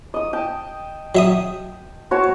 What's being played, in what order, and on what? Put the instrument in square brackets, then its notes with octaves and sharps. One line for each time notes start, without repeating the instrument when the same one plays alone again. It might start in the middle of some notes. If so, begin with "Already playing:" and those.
[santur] D#5 D#6
G5 A5
[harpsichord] F#3 E5 D#6
[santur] F#4 C#5 A5